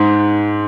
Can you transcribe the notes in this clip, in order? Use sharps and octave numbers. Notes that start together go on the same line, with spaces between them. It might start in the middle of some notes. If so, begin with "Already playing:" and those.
Already playing: G#2